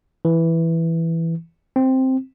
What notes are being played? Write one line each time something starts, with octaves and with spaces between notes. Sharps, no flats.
E3
C4